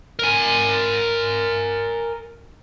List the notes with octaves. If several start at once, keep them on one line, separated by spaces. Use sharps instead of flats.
A#4 G#5